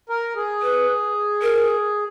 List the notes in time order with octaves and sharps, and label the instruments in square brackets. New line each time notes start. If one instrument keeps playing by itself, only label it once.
[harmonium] A#4
G#4
[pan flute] B4
A#4